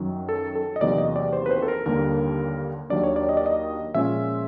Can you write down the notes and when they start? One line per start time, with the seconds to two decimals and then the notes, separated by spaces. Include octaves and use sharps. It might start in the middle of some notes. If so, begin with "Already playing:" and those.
Already playing: F#2 D#3 F#3
0.29 A4
0.55 A4
0.76 D#5
0.81 E2 C3 D#3 F#3 A#3 D5
0.98 D#5
1.16 D5
1.33 C5
1.46 B4
1.51 C5
1.62 A4
1.68 A#4
1.86 D#2 D3 G3 A#3 A#4
2.90 D#2 D#3 F#3 A#3 D4 D5
3.03 C#5
3.16 D5
3.29 D#5
3.37 D5
3.46 D#5
3.94 A#2 F3 G#3 C#4 F4 E5